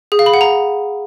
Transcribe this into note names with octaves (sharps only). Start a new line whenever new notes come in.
G#4
F5
B5
F#5
A#5